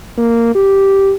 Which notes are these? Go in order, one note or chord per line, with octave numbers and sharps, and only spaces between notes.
A#3
G4